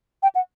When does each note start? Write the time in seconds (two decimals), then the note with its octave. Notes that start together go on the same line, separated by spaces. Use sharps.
0.23 G5
0.35 F#5